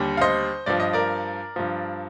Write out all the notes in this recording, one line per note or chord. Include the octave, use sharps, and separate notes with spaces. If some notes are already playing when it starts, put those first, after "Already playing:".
Already playing: D#2 D3 G3
F5
C5 D#5
G2 F3 D5
D#5
A#4 D5
G2 F3